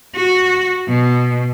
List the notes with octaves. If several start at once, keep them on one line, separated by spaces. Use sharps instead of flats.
F#4
B2